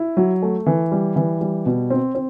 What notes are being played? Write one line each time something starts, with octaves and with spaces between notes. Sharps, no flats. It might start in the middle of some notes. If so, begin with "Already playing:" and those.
Already playing: E4
F#3
A3
E3
G3
E3
G3
B2
C4
C4